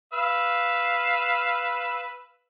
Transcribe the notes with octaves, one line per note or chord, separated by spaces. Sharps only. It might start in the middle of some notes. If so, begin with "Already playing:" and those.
B4 F5 E6